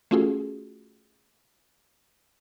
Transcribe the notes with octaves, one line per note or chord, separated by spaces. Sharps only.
A3 C#4 F4 F#4 G#4 A4